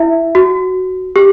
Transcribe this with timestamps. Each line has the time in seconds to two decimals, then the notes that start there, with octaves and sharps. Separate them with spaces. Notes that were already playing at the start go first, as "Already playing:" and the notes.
Already playing: E4 E5
0.35 F#4
1.16 G4